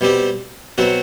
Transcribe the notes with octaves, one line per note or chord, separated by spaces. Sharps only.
B2 G3 C4 G4
B2 F#3 C4 F#4